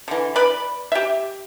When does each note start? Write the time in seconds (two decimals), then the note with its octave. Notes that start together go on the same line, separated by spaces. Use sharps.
0.08 D3 E3
0.36 B4 D5 B5
0.92 G4 E5